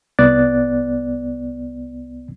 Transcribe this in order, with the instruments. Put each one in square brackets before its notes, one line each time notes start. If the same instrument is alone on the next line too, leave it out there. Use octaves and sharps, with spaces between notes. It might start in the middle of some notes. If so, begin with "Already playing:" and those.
[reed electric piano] C2 B3 D5 F#6 A6